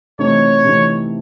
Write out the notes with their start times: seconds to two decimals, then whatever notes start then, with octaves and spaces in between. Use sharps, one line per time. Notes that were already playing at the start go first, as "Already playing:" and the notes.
0.19 C3 E3 A3 C4 D#4 C#5
0.64 C3 E3 A3 C4 D#4